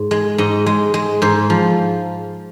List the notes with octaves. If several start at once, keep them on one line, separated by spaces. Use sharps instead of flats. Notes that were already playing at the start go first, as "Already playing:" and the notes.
Already playing: G#2
G#3
G#2 D#5
G#3
G#3
G#2 C5
F3